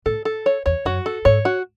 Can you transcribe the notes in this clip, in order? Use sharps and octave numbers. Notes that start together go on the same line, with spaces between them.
A2 A4
A4
C#5
E2 C#5
F#2 F#4
A4
G#2 C#5
F#4